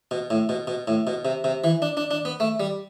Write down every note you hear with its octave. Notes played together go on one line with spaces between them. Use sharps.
B2
A2
B2
B2
A2
B2
C3
C3
E3
D4
D4
D4
B3
A3
G3